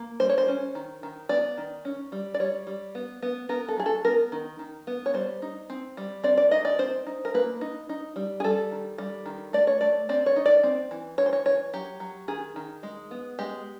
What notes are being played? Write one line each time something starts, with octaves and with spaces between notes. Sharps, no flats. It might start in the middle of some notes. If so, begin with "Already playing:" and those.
Already playing: A#3
G3 C5
C#5
C5
C#4
D#3
D#3
B3 D5
D#3
C#4
G3
D5
G3 C#5
G3
B3
B3
B3 A#4
A4
F#3 G#4
A4
B3 A#4
D#3
D#3
B3
C#5
G3 C5
D#4
C4
G3
C4 D5
D5
D#4 D#5
D5
C4 C5
D#4
A#4
A#3 B4
D#4
D#4
G3
G#4
G3 A4
D#3
G3
D#3
A3 D5
C#5
A3 D5
C4 D5
C#5
D#4
D5
C4
E3
E3 C#5
C5
C#5
E3 C#5
F#3 G4
F#3
D#3 G#4
D#3
G#3
B3
G#3 G4